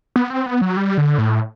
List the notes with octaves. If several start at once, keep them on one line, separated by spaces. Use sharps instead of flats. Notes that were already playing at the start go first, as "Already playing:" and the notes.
B3
C4
B3
F#3
G3
D3
A2